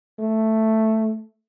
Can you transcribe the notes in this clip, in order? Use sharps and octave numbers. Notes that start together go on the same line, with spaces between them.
A3